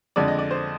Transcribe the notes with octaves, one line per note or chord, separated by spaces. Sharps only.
F2 D3 G#3 D5
D#5
D5
C5